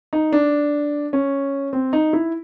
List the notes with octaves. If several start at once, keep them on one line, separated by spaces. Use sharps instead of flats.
D#4
D4
C#4
C4
D#4
E4